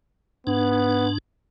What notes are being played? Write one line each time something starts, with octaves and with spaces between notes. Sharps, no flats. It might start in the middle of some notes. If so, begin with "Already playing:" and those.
G#2 B3 D4